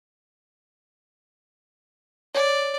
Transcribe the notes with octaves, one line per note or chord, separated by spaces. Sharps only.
C#5 D5